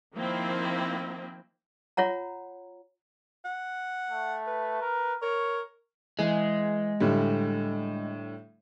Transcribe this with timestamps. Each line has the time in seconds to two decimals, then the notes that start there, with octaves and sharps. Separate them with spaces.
0.15 D#3 F3 A#3 C4 E4
1.97 F4 C#5 F#5 A#5
3.45 F#5
4.10 A3
4.48 B4
4.82 A#4
5.22 A#4 C#5
6.19 E3 G#3
7.00 A2 D3 G3